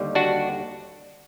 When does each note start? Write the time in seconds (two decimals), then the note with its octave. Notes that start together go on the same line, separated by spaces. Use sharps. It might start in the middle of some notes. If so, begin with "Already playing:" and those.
Already playing: D#2 D3 G3
0.15 D4 F#4